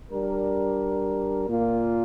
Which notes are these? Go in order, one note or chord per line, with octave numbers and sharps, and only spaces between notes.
G3 D4 A#4
A#2 A#3 F4